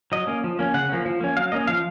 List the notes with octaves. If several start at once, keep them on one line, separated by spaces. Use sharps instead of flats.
F#3 D#5
A#3 C#4
F3
A#3 C#4
C#3 F#5
F3 A#3 C#4
F3
A#3 C#4
F#3 F5
A#3 C#4 D#5
F3 F5